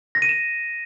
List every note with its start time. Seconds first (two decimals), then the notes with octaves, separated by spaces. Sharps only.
0.15 A#6
0.22 D#7
0.29 E7